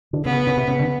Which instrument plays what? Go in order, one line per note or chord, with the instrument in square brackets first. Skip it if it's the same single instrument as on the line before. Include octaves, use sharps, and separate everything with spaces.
[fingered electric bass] D3
[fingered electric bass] C#3 [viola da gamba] B3
[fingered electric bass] C#3
C3
C#3
D3